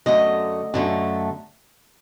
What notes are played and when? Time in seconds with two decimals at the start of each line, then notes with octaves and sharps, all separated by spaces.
0.06 F#2 D3 A3 D#5
0.74 F#2 D3 A3